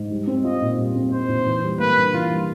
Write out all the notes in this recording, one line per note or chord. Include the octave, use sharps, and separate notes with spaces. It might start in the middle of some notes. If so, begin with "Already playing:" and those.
Already playing: G#2
G3
C4
F4 D#5
A#2
G3
C4
F4 C5
A#2
E3
G3
A#3 B4
G2
E3 F4
G3